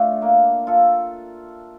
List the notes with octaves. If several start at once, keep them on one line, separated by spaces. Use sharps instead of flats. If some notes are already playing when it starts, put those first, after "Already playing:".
Already playing: A3 D4 F4
A#3
F4 A4